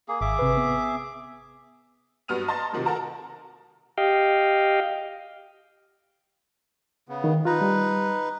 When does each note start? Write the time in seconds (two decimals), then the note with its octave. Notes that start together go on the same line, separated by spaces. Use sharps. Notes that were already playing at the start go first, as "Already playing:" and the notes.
0.08 A#3 G#4
0.21 G#1 G#4 E5 D6
0.39 C3 B4
0.57 B3
2.28 G2 F#3 B3 F6 D#7 F7
2.48 D#5 A5 A#5 C6 A6
2.73 C3 D#3 F3 F#3
2.85 F#4 A4 A#4 A5 A#5
3.98 G4 D#5 F5 G5
7.09 C#3 B3
7.24 D#3
7.45 D#4 F4 B4 A#5
7.61 G3